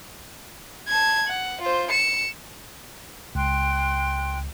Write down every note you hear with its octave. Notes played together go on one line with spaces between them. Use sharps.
A5 G#6
F#5
F4 C5
C#7 E7
C#2 G5 C6 F#6